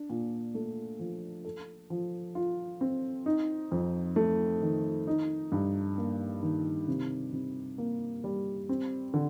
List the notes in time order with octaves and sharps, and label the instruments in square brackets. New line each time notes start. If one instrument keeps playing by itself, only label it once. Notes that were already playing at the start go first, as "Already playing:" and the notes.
Already playing: [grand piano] D4
A#2
A3
F3
A4
F3
F4
C4
D#4
F2
A3
D#3
D#4
G2
A#3
D#3
C3
C3
A#3
G3
C4
D3